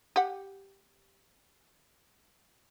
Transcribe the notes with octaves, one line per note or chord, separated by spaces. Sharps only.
G4 F#5